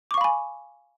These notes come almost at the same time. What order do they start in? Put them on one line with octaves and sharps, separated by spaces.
D6 C#6 F5 B5 G#5